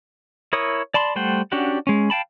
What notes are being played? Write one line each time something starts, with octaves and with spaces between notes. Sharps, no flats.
E4 A#4 C#5 D#6
D5 A5 B5 C6
G3 A3 C5 F#5 G5
C#4 D4 F#4 G4 F#5
G#3 C#4
F5 G5 A5 B5